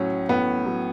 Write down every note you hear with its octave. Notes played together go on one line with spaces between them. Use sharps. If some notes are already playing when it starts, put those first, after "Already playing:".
Already playing: A2 F#3 C#4
A2 B3
F#3